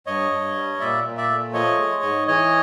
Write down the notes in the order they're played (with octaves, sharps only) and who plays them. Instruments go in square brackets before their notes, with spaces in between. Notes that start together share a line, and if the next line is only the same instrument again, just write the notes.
[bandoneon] G2 C#5 D#5
G2
G3
A#2 D5 E5
A#2
D5 E5
A3
F3 C#5 D#5
G#3
G#2
E3 C#5 D#5